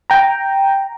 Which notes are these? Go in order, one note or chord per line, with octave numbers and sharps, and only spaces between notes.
G5 A#5